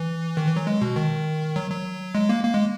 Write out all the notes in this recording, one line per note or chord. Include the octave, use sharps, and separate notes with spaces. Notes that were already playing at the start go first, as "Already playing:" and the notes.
Already playing: E3
D#3
E3
F#3
G#3
B2
D#3
F#3
F#3
G#3
A#3
A#3
G#3